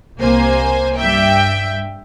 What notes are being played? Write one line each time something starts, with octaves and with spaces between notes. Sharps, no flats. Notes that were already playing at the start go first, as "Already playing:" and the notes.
C2 A#3 C5 G#5
G2 E5 G5